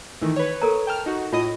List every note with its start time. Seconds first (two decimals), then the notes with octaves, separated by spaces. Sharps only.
0.22 D#3 E3 A3
0.36 B4 C#5
0.62 A4 A#4 A#5
0.87 G5 A5 F6
1.06 D#4 F#4
1.33 A2 F4 D#5 D#6